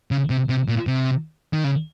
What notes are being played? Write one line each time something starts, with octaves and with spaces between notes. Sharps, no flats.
C#3
C3
C3
A#2
C3
D#3
C#3